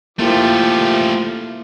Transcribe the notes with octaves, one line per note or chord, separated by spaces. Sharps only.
F3 A3 A#3 E4 F4 G4